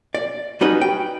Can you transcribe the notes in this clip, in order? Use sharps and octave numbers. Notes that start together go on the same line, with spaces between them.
D5
G3 C#4 D#4 F#4 B4 D#5
G5